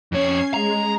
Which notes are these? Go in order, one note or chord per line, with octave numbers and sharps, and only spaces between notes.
F2 C#4 C#5 G#6 C7
G#3 A#5